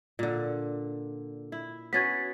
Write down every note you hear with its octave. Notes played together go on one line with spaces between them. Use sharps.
A#2 D3
E4
B3 C#4 F#4 G#6 A6 B6